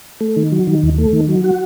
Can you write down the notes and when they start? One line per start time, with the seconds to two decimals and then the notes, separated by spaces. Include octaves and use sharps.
0.21 A3
0.37 D#3
0.52 F#3
0.67 D#3
0.83 D#2
0.98 A3
1.13 D#3
1.28 F#3
1.44 F#4